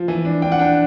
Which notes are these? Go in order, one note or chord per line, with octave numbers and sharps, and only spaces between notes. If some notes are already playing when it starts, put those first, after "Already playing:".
Already playing: F3
E3
D4
D4 G5
F#5
D4 G5